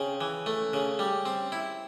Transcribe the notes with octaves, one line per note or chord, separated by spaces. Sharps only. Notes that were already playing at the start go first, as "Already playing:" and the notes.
Already playing: C#3 C4
E3
A3
C#3
G3
C4
E4